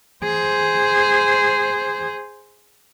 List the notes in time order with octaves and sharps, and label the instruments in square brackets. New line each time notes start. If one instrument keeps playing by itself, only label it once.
[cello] G#4 C5